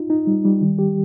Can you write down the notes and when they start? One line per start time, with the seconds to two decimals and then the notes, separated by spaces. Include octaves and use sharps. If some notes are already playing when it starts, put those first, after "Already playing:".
Already playing: D#4 F4
0.10 D#4
0.27 G3
0.45 G3
0.61 D#3
0.79 G4